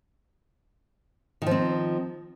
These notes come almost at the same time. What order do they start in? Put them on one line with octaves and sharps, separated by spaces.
D#3 F3 C4